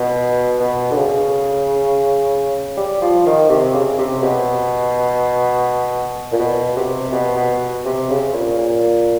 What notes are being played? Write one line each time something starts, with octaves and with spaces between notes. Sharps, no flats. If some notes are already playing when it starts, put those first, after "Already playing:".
Already playing: B2
B2
D3
C#3
G3
F3
D#3
C3
C#3
C3
B2
A#2
B2
C3
B2
B2
C3
C#3
A#2
A#2